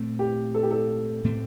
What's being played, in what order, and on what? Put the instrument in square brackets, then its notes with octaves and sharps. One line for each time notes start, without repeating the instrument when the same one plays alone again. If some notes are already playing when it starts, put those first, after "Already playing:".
Already playing: [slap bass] A#2 A3 C4
[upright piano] G4
A4
G4
A4
[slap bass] A2 A3 C4